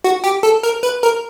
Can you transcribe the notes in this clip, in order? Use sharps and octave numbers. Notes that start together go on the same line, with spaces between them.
F#4
G4
A4
A#4
B4
A#4